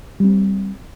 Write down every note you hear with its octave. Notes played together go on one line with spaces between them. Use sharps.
G3 C4